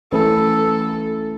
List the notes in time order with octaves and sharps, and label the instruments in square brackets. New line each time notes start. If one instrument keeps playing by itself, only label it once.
[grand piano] E3 A3 C#4 E4 B4 [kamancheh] A4